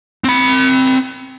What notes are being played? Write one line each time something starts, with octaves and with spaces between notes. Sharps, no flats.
C4 B5